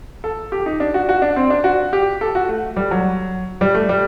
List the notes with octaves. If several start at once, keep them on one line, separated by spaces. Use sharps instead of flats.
A4
G4
D#4
D4
F#4
F#4
D4
C4
D4
F#4
G4
A4
F#4
A3
G3
F#3
G3
A3
G3